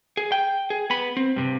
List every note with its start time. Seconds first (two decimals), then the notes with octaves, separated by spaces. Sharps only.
0.17 G#4
0.32 G5
0.70 G#4
0.90 B3 B5
1.17 C4
1.36 G2 C3